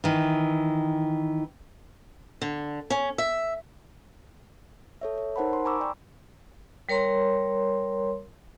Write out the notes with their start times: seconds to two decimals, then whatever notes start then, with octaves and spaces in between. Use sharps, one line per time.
0.04 D#3 E3
2.42 D3
2.90 C#4
3.18 E5
5.01 A4 C#5 E5
5.18 C#5
5.36 D#4 A#4 C5 F#5 A5 B5
5.53 C6
5.65 G#5 A#5 B5 C#6 D6 E6
5.80 D5 G5
6.89 G3 A#4 C#5 A#5 C6